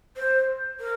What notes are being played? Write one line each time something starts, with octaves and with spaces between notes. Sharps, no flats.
C5
A#4